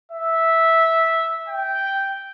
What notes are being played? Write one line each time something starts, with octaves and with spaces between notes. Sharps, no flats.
E5
G5